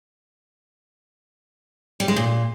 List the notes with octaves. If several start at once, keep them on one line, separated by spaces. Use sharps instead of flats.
G3
G#3
A#2